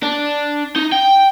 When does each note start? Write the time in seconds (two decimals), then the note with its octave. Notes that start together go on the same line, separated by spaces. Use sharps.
0.03 D4
0.76 D#4
0.92 G5